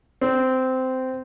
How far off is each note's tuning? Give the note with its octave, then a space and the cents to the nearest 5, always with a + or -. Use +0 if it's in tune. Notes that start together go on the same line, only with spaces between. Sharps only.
C4 -15